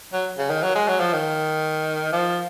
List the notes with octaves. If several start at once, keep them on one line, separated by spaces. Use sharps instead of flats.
F#3
C#3
D#3
F#3
G#3
F#3
F3
D#3
F3